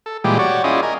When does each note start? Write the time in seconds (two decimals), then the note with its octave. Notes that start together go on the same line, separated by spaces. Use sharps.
0.06 A4
0.24 A#2 E3 G3 G#3 G4
0.39 F#4 G4 C#5 D5
0.64 C#4 E4 F4 G#4 D5 D#5
0.83 A#4 D#5 G#5